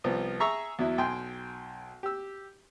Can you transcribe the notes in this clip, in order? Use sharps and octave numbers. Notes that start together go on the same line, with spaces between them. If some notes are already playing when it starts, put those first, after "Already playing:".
C2 F3 B3
G#4 E5 A#5 C#6 E6
E2 F#3 E4
B1 G5 G#5 C6
G4 E6